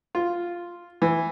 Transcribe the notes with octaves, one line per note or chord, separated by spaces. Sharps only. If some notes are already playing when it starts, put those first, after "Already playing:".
F4
E3